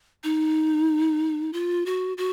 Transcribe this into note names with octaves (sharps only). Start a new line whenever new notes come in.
D#4
F4
F#4
F#4